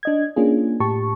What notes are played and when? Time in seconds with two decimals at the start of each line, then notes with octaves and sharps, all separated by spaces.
0.03 D4 D#5 G#6
0.36 A#3 C#4 D4 F4 G#4
0.80 A2 G4 A5 C#6